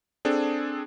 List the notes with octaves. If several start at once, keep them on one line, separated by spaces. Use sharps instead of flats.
C4 D4 G#4 A4